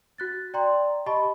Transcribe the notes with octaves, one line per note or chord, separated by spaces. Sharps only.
F#4 F#6 A6
D5 G5 A#5 C6
G4 D#5 A5 B5 C#6